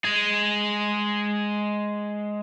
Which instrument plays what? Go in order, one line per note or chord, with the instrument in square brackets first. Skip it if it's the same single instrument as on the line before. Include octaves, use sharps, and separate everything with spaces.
[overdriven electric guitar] G#3 G#4